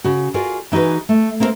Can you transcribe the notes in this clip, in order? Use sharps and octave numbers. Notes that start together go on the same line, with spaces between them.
C#3 F#4
F4 F#4 G#4 A#4 D5
E3 D#4 F#4 G#4 B4
A3
A#3 C4 E4 G#4 A#4 C5